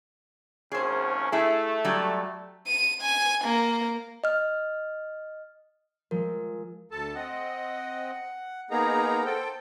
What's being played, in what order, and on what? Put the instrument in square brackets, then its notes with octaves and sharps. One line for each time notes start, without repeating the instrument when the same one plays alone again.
[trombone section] G#1 D#2 C#4 [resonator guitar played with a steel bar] G#4 C5
[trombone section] A3 [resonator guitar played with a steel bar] E4 G#4
[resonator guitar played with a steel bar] F#3 G3
[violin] D#7
G#5
A#3
[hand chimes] D#5 F6
[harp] F3 G#3 [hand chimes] A#4
[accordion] D2 A4 A5
[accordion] C4 D#5 [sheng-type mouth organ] F#5
[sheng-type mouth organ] A#3 B3 A#4 [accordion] D#4 G#4 A#5
[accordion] A4 G5 [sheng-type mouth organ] C5